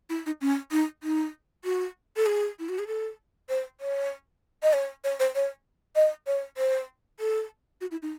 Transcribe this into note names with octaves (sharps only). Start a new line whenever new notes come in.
E4
D#4
C#4
D#4
D#4
F#4
A4
G#4
E4
F#4
G#4
A4
C5
C#5
D#5
C#5
C#5
C5
C#5
D#5
C#5
C5
A4
F#4
E4
D#4